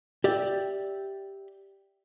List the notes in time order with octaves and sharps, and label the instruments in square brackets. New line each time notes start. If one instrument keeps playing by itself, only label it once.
[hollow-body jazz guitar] G4 D5 E5